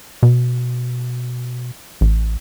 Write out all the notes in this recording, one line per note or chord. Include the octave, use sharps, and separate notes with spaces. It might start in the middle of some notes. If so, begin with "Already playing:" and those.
B2
A1